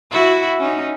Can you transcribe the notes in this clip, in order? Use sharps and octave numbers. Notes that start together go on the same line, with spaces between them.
E4 F#4
C#4 D#4